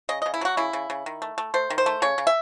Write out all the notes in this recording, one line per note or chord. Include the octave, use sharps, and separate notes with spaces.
C#3 D#5
C#3 D#5
E4
F#3 F#4
C#3 E4
C#3
C#3
D#3
A3
A3
A3 C5
D#3
C5
A3
C#3 C#5
C#3
E5